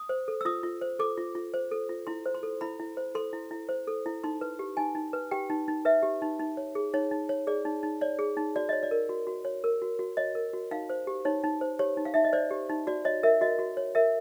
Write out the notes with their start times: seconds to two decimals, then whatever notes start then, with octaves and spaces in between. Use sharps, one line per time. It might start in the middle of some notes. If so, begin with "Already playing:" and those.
Already playing: D#6
0.09 C5
0.28 A4
0.41 E6
0.45 F4 D#6
0.63 F4
0.81 C5
0.99 A4 D6
1.18 F4
1.35 F4
1.54 C5
1.72 A4
1.89 F4
2.07 E4 C6
2.26 C5
2.34 C6
2.43 A4
2.61 E4 B5
2.80 E4
2.97 C5
3.15 A4 C6
3.33 E4
3.51 E4
3.69 C5
3.87 A4
4.06 E4
4.24 D#4 C6
4.41 B4
4.59 G4
4.77 D#4 G#5
4.95 D#4
5.13 B4
5.31 G4 G5
5.50 D#4
5.68 D#4
5.85 B4 E5
6.03 G4
6.22 D#4
6.40 D#4
6.57 C#5
6.75 G#4
6.94 D#4 C#5
7.11 D#4
7.29 C#5
7.47 G#4 D5
7.65 D#4
7.83 D#4
8.01 C#5 D5
8.19 G#4
8.37 D#4
8.56 F#4 D5
8.69 C#5 D#5
8.83 D5
8.91 A#4
9.09 F#4
9.27 F#4
9.45 C#5
9.64 A#4
9.82 F#4
9.99 F#4
10.17 C#5 D#5
10.35 A#4
10.53 F#4
10.71 D#4 F5
10.89 C5
11.07 G4
11.25 D#4 C#5
11.44 D#4
11.61 C5
11.79 G4 C#5
11.97 D#4
12.05 F5
12.14 D#4 E5
12.24 D#5
12.33 C5 D5
12.51 G4
12.69 D#4
12.87 F#4 D5
13.05 C#5 D#5
13.23 A#4 E5
13.41 F#4 D#5
13.59 F#4
13.77 C#5
13.95 A#4 E5